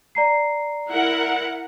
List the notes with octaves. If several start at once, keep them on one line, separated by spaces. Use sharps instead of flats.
D5 A#5 C7
E4 A#4 F#5